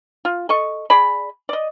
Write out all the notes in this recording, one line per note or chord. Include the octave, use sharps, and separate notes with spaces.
F4
A4 D#5 C#6
G#4 D5 B5
D5 D#5